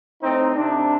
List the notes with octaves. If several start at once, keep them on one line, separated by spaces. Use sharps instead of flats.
A2 C4 D#4
C3 D4